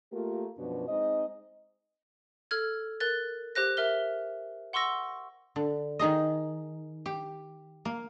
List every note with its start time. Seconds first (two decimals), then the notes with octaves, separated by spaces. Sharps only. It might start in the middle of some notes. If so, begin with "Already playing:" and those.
0.13 A3 A#3 F4 G4 A#4
0.58 F#2 B2 F3 D4 F#4 B4
0.88 G#3 C4 D#4 D#5
2.51 A4 F6 G#6
3.00 A#4 F#6 A6
3.55 G4 C5 F#6 A#6
3.77 A#4 E5 F6 G7
4.73 F#5 C6 C#6 E6 A#6
5.56 D3
5.99 D#3 D#4 G#4 D#5
7.06 G4
7.85 A#3